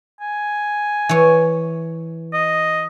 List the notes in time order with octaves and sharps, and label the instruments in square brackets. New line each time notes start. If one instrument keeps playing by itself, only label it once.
[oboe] G#5
[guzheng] E3 C#5
[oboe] D#5